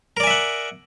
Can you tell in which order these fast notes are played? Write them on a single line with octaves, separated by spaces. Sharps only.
A#4 D5 G#5 E5 F#5